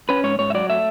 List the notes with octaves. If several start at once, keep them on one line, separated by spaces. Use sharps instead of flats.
C#4 B4
G#2 C#5
G#2 C#5
E5
F#3 D5
A3 E5